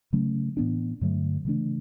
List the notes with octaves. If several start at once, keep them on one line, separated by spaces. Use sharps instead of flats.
C#3 F#3 A3 C#4
A2 E3 B3 D4
G2 D3 F#3 A3
C#3 E3 A3 D4